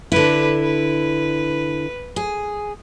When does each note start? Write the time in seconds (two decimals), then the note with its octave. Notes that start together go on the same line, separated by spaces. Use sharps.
0.12 D3 D4 E4 B4
0.63 B4
2.16 G#4